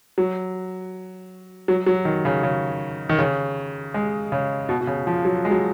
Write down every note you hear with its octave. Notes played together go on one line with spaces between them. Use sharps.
F#3
F#3
F#3
D#3
C#3
C#3
D#3
C#3
G#3
C#3
B2
B2
C#3
F3
F#3
G#3
F#3